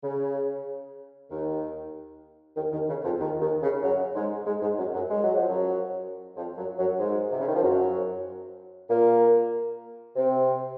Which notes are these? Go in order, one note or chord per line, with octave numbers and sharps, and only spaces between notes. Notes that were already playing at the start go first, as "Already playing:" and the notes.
C#3
D#2 D#3
D#2 D#3
D#2 D#3
C#3
F2 F3
D#2 D#3
D#2 D#3
C#3
F#2 F#3
G#2 G#3
G#2 G#3
G#2 G#3
F#2 F#3
F#2 F#3
G#3
F#3
F3
F#2 F#3
F2 F3
F#2 F#3
F#2 F#3
G#2 G#3
C3
C#3
D#3
F3
F#2 F#3
A#2 A#3
C3 C4